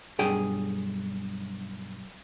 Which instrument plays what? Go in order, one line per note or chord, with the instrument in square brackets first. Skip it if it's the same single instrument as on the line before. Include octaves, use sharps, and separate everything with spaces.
[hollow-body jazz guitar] B1 G2 G#4 G5